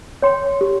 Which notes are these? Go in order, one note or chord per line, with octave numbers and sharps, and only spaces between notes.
C#5 G5 C6
G4